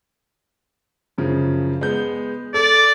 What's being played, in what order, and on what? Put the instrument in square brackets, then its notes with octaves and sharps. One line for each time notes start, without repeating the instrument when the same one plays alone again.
[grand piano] F#2 C#3 F3
G#3 B3 G6
[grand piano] A4 [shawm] D5